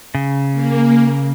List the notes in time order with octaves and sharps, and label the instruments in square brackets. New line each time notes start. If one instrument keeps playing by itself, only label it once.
[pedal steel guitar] C#3
[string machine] A#3